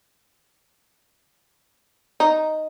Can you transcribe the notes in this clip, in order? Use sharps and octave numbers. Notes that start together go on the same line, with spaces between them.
D#4